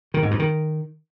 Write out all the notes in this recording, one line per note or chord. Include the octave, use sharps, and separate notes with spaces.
D#3
G#2
G2
D#3